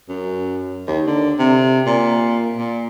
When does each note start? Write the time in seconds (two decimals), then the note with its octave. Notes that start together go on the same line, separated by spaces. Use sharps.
0.09 F#2
0.88 D#2
1.07 D3
1.39 C3
1.86 A#2
2.58 A#2